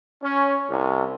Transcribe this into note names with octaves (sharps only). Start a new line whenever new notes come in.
C#4
C2